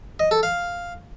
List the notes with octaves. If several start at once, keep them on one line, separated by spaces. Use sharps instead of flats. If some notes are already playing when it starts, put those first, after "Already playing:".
D#5
A4
F5